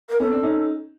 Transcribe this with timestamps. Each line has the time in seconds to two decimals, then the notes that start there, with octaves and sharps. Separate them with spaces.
0.09 A#4
0.20 B3 C#4 A4
0.31 C4 D4
0.43 C#4 D#4